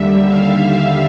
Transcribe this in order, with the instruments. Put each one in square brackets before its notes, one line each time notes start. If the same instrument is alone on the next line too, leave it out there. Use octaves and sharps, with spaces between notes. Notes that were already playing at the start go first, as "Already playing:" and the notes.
Already playing: [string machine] D#2 D3 G3 E5
F5
E5